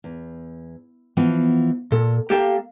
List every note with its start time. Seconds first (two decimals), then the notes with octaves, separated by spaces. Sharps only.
0.04 E2
1.17 E3 F3 B3
1.92 A#2 A4
2.30 A#3 G4 A4 E5 F5 G5